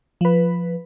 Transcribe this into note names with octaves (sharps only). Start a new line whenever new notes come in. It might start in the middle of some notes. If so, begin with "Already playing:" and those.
F3 B4